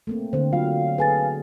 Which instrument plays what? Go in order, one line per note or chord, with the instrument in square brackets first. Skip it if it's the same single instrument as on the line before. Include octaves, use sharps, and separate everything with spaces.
[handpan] A3 A#3 C4
[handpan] D3 C4 [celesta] C5
[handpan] F#3 [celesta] F4 [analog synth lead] F5
[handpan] G#4 A4 [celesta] B4 G#5 A6